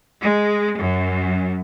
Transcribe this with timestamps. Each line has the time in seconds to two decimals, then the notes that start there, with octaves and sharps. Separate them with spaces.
0.22 G#3
0.78 F#2